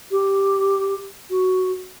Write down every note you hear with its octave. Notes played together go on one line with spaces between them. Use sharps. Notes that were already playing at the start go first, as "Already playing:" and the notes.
G4
F#4